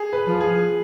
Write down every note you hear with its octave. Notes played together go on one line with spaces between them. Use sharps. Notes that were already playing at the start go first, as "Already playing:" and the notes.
Already playing: G#4
B4
F3
G#4